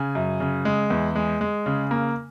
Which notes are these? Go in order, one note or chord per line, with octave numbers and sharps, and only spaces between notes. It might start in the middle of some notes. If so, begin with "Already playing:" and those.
Already playing: C#3 G#5
F#2
C#3
G#3
E2
G#3
G#3
C#3
A#3